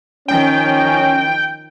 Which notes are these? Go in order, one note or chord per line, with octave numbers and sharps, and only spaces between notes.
D#3 F3 C#4 G5